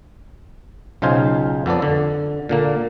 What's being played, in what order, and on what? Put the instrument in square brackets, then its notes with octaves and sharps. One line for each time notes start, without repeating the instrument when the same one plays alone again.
[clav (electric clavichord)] B1 C#3 D#4 F4 C5 G#5
F2 B3 A4 D5
D3
A#2 D3 A#3